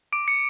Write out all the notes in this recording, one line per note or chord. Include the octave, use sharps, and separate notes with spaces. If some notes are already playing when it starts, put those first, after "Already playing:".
D6 D7
C#7